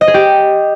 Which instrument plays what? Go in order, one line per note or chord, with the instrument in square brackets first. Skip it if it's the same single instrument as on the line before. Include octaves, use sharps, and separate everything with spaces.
[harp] D#5
G#4
G4